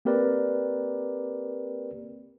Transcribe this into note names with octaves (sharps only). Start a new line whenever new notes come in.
A#3 C4 G4 A#4 B4 D5